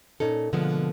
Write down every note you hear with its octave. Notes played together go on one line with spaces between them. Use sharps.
A#2 C#4 D#4 A4
B2 D3 F3 G#3 A#3 B3